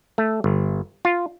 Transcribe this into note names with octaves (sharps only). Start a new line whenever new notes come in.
A3
G1
F4